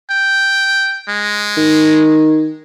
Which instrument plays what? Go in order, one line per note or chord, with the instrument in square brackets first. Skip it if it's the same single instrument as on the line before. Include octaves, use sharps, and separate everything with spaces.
[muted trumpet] G5
G#3
[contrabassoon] D#3